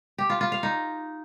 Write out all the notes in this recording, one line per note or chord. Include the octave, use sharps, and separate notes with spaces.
G4
F4
F4
F5
D#4